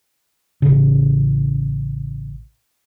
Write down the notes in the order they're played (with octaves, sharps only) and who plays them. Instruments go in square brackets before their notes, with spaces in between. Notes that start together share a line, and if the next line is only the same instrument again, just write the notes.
[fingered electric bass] A1 C#3